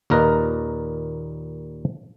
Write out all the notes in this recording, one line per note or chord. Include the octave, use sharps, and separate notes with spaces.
D#2 A#2 A#4 B4 D#5 A#5